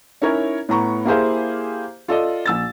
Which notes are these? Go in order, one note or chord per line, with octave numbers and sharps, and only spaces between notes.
C#4 D#4 E4 A#4 C#5
A2 B3 A#5 C#6
A#3 E4 G4 G#4 C5 F5
F4 A4 D5 D#5
A#1 E6 A6